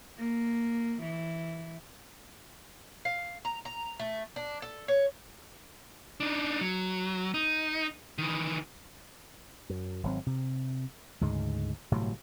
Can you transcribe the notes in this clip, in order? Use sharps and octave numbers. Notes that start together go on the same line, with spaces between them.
A#3
E3
F5
A#5
A#5
A3
D4
A4
C#5
D4 D#4
F#3
D#4
D#3 E3
F#2
G#1 F#3 C4
C3
D2 G#2 C#3 G#3
G1 A2 C3 F#3